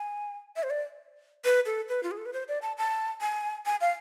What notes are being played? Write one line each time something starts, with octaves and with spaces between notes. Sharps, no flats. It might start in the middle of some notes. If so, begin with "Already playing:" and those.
Already playing: G#5
E5
C5
D5
B4
A4
B4
F4
G#4
A4
B4
C5
D5
A5
A5
G#5
G#5
F5